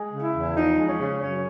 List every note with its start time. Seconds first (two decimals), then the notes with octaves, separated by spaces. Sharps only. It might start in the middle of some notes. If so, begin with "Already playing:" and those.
Already playing: G#3
0.11 C#3
0.23 E4
0.34 E2
0.55 F3 D#4
0.78 G#3
0.88 C#4
0.99 C#3
1.22 F#2 C#4